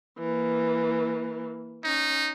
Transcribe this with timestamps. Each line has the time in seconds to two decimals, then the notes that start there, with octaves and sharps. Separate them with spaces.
0.19 E3 A#3
1.84 C#4 D#4